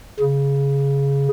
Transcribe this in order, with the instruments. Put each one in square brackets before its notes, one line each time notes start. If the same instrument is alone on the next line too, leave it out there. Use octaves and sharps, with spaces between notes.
[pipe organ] C#3